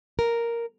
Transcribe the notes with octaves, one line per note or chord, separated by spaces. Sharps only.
A#4